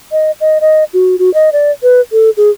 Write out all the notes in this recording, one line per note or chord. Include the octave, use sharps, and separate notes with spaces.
D#5
D#5
D#5
F#4
F#4
D#5
D5
B4
A4
G#4